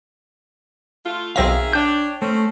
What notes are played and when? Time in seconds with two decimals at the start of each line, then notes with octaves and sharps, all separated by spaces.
1.04 A3 F4
1.36 B1 D#3 C4 G#4 E5 F5 A#6
1.73 D4 C#5 G5 G6
2.22 A3 C4 C#4